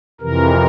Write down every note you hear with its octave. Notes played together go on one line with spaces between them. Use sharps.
F2 C3 E3 A#4